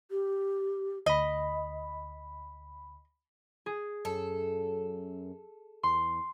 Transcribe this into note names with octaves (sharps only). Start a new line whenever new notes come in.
G4
D2 D#5 B5
G#4
F#2 A4
E2 C6